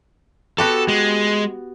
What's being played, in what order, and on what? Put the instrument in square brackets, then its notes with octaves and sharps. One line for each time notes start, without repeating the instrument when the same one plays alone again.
[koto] B3 F#4 G4 [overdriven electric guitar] A4
[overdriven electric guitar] G#3